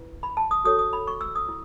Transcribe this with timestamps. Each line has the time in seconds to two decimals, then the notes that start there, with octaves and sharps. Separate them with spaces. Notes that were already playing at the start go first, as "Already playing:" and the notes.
Already playing: E4 B4
0.23 B5
0.37 A5
0.51 D#6
0.64 F#4 A4 C#5 D#6
0.79 D#6
0.93 B5
1.07 C#6
1.21 E6
1.35 D#6
1.49 E4